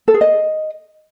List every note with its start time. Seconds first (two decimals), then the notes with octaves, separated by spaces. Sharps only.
0.08 A4
0.14 G#4
0.21 D#5